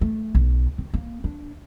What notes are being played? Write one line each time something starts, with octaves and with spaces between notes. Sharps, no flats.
A3
B1
D#3
A#3
D4